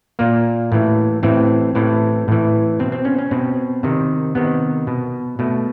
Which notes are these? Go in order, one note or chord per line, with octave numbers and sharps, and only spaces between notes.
A#2 A#3
A2 E3
A2 E3 C4
A2 E3
A2 E3
B2 C4
C4
C#4
C#4
B2 C4
C3 D#3
C3 D#3 B3
B2
B2 A3